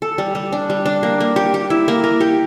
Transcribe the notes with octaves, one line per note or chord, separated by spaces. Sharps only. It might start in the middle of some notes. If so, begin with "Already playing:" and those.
A4
G3
G3
D4
G3
D4
A#3
A#3
G4
G4
E4
A#3
A#4
G4